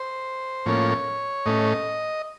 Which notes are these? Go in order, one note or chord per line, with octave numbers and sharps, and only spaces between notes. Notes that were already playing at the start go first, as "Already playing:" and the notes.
Already playing: C5
A2 F3 A#3 C#4 C#5
A2 A3 C#4 D#5